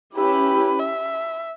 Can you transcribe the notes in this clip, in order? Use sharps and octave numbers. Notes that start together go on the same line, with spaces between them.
C#4 E4 G4 B4
E5